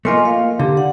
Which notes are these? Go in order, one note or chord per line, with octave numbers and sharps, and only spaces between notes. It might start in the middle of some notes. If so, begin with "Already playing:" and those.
A3 A#3 F4 D#5 G#5 C6
F5
D3 G4
D5 F#5